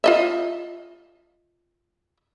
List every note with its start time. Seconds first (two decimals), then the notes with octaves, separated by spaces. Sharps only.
0.04 F4 D#5 E5